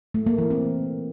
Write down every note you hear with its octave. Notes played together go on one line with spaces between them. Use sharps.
A3
A#3
E3
C4